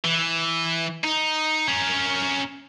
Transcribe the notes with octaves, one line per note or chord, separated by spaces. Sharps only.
E3
D#4
C#4 A#4